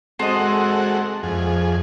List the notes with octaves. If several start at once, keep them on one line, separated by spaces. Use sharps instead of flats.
G#3 C4 F#4 A4 D#5
F2 G#4